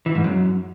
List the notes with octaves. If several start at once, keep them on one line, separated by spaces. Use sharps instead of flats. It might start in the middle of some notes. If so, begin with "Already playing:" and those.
E3
G#2
F#2